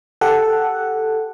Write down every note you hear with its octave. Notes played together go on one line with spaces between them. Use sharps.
G4 A4 F#5